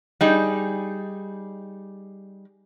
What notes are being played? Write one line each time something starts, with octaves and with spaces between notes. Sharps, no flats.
G3 D#4 G#4